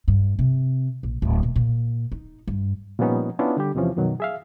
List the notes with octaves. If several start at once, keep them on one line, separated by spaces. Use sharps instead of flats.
G2
C3
A#1
D1
A#2
A#2
D#4
G2
A#2 F3 G3 B3 C#4 D#4
B3 C#4 D4 E4 F4
D3 G3 G4
E2 C3 E3 F3 C#4
F#2 B2 D#3 F#3
G#4 E5 F5